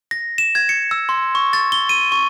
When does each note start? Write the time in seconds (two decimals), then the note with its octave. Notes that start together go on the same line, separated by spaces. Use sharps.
0.11 A#6
0.38 E7
0.55 G#6
0.69 C#7
0.91 E6
1.09 C6
1.35 C#6
1.53 A6
1.72 G7
1.89 D#7
2.12 C#6